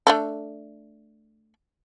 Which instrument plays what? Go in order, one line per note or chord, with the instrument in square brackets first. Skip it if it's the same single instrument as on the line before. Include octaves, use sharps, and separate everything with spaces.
[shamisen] A3 D4 A4